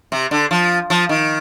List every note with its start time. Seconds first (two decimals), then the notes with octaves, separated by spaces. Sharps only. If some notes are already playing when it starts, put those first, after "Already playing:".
0.12 C3
0.31 D3
0.51 F3
0.90 F3
1.09 D#3